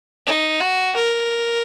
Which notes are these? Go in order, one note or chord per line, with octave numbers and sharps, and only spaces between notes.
D#4
F#4
A#4